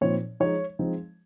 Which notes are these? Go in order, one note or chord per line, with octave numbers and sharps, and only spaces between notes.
A#2 F3 C4 D#4 C#5
F3 G#3 D#4 C#5
F3 G#3 C4 D#4